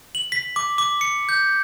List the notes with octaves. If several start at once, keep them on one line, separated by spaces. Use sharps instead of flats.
F#7
B6
D6
D6
C#7
G6